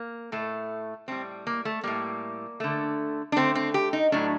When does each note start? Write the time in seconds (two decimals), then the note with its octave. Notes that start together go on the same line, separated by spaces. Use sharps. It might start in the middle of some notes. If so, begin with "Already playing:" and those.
Already playing: A#3
0.32 A2 A3
1.08 A2 G3 C4
1.47 A#3
1.65 A3
1.84 A2 G3 A#3
2.60 D3 A3
3.32 D4
3.36 D3 A3 C4
3.55 C4
3.74 G4
3.93 D#4
4.12 A2 F#3 A3 D4